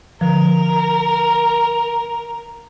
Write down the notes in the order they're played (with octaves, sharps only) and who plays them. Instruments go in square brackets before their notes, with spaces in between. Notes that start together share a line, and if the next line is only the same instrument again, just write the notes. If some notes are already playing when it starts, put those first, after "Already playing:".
[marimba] D3 F3 [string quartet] A#4